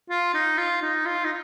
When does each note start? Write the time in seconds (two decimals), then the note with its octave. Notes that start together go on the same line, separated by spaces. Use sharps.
0.10 F4
0.34 D#4
0.58 F4
0.82 D#4
1.06 F4
1.25 D#4